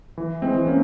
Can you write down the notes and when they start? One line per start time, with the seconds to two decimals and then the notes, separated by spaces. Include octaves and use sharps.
0.18 E3
0.42 G#3 C4
0.55 E3
0.67 A#3 C#4